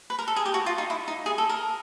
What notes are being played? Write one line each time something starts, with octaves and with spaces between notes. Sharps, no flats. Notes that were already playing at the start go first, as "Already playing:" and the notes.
B4
A#4
A4
G#4
G4
F#4
F4
D#4
E4
D#4
G#4
A4
A#4